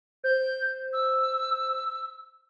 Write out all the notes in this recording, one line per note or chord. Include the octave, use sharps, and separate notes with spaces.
C5 G6
E6